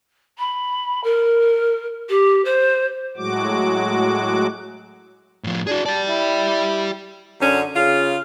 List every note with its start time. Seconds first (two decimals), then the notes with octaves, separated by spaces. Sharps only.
0.38 B5
1.03 A#4
2.09 G4
2.45 C5
3.17 A2 F#3 G#3 F#4 D6
5.44 A2 F3
5.67 D4 F#4 G#4
5.86 G4 D5 A5
6.08 E4
7.40 F#2 D3 C#4
7.75 C#3 F4